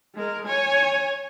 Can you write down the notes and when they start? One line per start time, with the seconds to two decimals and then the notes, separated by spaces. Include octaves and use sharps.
0.15 G#3 A#4
0.46 C#5 G#5